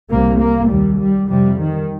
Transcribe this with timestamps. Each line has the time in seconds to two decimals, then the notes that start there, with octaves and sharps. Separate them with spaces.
0.10 C2 C3 A#3
0.39 A#3
0.69 D#2 G3
0.99 G3
1.29 F2 C3 G3
1.58 D#3